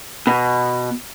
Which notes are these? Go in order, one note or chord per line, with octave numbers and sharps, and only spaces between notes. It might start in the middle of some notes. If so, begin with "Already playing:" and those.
B2